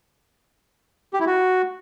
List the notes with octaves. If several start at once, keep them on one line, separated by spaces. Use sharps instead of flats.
G4
E4
F#4